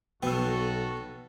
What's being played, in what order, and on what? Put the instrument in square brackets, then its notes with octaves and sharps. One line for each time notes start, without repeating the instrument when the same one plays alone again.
[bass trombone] B1 [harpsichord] B2 B3 [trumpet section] F#4 A4 [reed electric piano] G5 E6